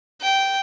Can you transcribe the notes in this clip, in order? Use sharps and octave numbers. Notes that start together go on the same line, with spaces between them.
G5